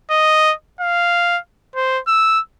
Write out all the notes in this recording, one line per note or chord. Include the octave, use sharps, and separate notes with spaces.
D#5
F5
C5
E6